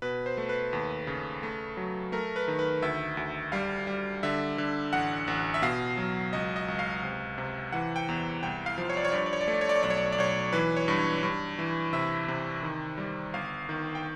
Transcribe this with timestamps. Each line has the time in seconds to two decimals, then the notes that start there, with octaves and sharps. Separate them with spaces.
0.02 B2 B4
0.26 C5
0.37 A3
0.49 B4
0.73 D#2
1.07 C#3
1.43 A3
1.77 F#3
2.12 A3 A#4
2.36 B4
2.48 D#3
2.59 B4
2.82 D2 E5
3.17 D2
3.52 G3 F5
3.87 G3
4.23 D3 E5
4.58 D3
4.93 A1 F#5
5.28 A1
5.54 E5
5.62 B2 F5
5.97 F#3
6.33 C#2 D#5
6.56 D#5
6.68 C#2
6.79 F5
7.03 C3
7.38 C3
7.73 E3 F#5
7.96 G5
8.09 E2
8.43 C2 G5
8.66 F5
8.78 F3
8.90 C#5
8.97 D5
9.05 C#5
9.12 G2 D5
9.18 C#5
9.26 D5
9.33 C#5
9.41 D5
9.48 A3 C#5
9.54 D5
9.61 C#5
9.69 D5
9.76 C#5
9.83 B1 D5
9.90 C#5
9.97 D5
10.06 C#5
10.12 D5
10.18 B1 C#5
10.53 E3 B4
10.77 C#5
10.88 G2
11.23 G2
11.59 E3
11.93 C3 E5
12.28 C3
12.63 D#3
12.98 G3
13.34 G1 F5
13.69 D#3
13.95 G5